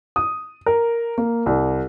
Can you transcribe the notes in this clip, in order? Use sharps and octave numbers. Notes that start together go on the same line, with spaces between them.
D#6
A#4
A#3
C2